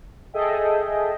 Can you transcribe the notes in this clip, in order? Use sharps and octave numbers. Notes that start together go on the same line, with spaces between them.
G#4 A4 D#5 E5 G5